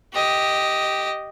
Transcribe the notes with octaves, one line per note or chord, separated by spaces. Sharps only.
G4 D#5